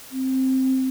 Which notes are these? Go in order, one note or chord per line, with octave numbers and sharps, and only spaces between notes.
C4